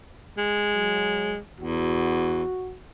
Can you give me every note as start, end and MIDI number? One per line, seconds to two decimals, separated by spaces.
0.38 1.39 56
0.75 1.34 54
1.60 2.43 40
1.60 2.74 66